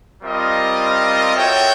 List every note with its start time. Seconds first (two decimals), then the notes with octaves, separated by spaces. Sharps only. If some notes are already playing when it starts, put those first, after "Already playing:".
0.21 G3 C4 F4 A#4 D#5
1.34 F#4 A4 C#5 E5 G5